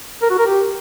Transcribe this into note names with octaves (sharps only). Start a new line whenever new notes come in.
A#4
F#4
A#4
G4